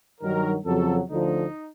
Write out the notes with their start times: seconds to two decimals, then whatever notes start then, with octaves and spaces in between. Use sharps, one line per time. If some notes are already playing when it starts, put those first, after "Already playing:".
0.21 G2 D#3 F#3 A#4
0.65 F2 C#3 F#3 A4
1.09 D2 D3 F3 D#4